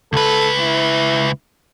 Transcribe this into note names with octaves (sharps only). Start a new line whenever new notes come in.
C#2 A4 B4
E4